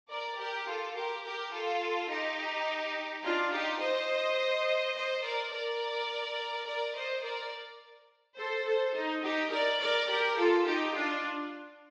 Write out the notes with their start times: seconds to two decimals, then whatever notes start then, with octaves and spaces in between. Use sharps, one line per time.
0.10 A#4 D5
0.38 G4 A#4
0.67 F4 A4
0.95 G4 A#4
1.24 G4 A#4
1.52 F4 A4
2.09 D#4 G4
3.23 D4 F4
3.52 D#4 G4
3.80 C5 D#5
4.95 C5 D#5
5.24 A#4 D5
5.52 A#4 D5
6.66 A#4 D5
6.95 C5 D#5
7.23 A#4 D5
8.37 A4 C5
8.66 A4 C5
8.94 D#4
9.23 D#4 G4
9.52 A#4 D5
9.80 A#4 D5
10.08 G4 A#4
10.37 F4 A4
10.65 D#4 G4
10.95 D4 F4